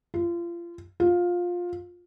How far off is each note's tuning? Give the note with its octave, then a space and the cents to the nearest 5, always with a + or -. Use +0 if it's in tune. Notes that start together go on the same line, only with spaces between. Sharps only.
F4 -30
F4 +15